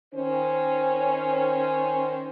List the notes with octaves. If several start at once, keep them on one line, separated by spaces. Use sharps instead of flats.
D#3 C#4 C5